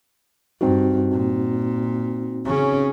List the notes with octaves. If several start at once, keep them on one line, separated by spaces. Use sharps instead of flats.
G2 C4 D#4 F#4
A#2
C#3 C#4